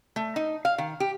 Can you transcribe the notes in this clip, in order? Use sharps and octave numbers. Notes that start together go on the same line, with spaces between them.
A3
D#4
F5
D#3
G4